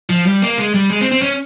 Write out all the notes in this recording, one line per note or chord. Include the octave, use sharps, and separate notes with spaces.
F3
G3
A#3
G#3
G3
G#3
C4
C4
C#4